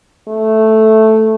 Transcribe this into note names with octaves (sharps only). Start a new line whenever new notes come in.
A3